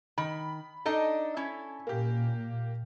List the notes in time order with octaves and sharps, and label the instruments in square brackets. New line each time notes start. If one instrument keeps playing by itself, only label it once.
[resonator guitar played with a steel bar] D#3 [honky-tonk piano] B5
[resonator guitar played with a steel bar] D4 D#4 D#5 [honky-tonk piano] A4
[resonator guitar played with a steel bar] C#4 E4
[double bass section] A#2 [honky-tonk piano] A#3 G4